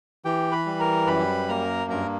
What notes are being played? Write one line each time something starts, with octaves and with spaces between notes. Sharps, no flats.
E3 G4 G5
B4 B5
G3
A#4 A#5
F#2 B4 B5
A#3 A#4 A#5
G2 A#4 A#5